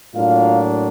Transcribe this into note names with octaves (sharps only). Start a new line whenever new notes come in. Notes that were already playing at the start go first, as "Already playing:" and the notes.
A2 F#3 A#3 D4 F4 F5